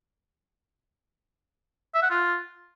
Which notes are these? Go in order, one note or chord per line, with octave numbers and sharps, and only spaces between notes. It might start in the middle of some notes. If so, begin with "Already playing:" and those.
E5
F#5
F4